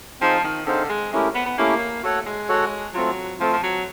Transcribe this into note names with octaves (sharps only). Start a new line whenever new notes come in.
F3 C4 D#4 G#4 C5 F5
D#3
D3 C4 D#4 G#4 C5 F5
G#3
G#3 A3 C#4 E4 G4 A#4
B3
B3
A3 A#3 C#4 E4 G4 A#4
A3 F#4 A4 C#5 F#5
G#3
F#4 A4 C#5 F#5
F#3 A3 C4 F4
F3 A3 C4 F4
F3
F#3